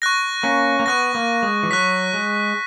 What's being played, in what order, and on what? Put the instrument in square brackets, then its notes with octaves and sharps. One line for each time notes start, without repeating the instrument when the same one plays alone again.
[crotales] C#6 F#6 A#6
[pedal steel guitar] A#3 C#4
A#3
[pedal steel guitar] B3 [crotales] C#6 F#6 A#6
[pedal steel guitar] A#3
G#3
E3
[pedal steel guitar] F#3 [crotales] C#6 F#6 B6
[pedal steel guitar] G#3